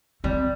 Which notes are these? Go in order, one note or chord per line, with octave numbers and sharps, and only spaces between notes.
G3 C4